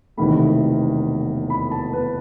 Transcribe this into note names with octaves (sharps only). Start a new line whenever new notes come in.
E1 E2 C3 D#3 A3 B5
B5
A5
B4